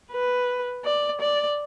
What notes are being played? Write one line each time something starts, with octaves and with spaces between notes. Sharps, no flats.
B4
D5
D5